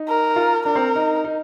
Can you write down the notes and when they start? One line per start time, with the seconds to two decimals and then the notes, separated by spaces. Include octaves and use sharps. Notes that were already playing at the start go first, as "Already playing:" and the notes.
Already playing: D#4
0.08 A#4
0.36 F4
0.65 D4 A#4
0.75 C4
0.95 D#4
1.24 D#4